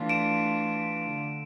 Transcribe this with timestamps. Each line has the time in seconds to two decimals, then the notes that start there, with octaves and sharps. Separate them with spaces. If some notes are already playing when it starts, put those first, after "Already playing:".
Already playing: E3 A3 D4 F4
0.09 D7 E7
1.15 D3